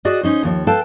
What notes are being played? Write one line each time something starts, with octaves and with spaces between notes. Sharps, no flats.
F#4 G#4 D5 D#5
C#4 D#4 C5
D#2 F3 C#5
A4 B4 F5 G5 A5